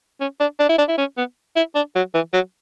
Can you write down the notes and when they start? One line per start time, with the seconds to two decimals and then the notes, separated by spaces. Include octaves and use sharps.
0.21 C#4
0.40 D4
0.59 D4
0.69 E4
0.78 D4
0.88 E4
0.98 C#4
1.17 B3
1.56 E4
1.75 D4
1.95 F#3
2.14 E3
2.33 F#3